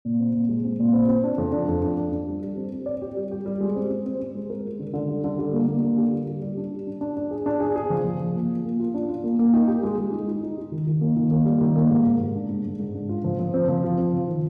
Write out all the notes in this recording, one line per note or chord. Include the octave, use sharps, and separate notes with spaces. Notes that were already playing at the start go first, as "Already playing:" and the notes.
A#2
C4
A#2
G#3
C4
A#2
C4
C4
D4
F2
D4
F2
D4
D4
D4
G3
G3
C4
C4
D5
G4
G3
G4
G3
G#3
C4
C4
C4
C4
G#3
A#4
G#3
D3
D3
G3
D3
G3
A#3
A#3
D3
G4
G3
G3
G3
D4
G3
D4
D4
D4
G#4
D4
G#4
G#4
F3
F3
F3
A#3
F4
A#3
F4
D4
F4
A#3
A#3
D#4
G4
G#3
G#3
D#4
D#4
D#4
G4
D#3
D#3
A#3
D#3
A#3
G3
D#3
A#3
G#2
G#2
G#2
D4
G#2
G#2
G#2
D4
F4
F3
F3
C4
F3
F4
C4
F3
D#3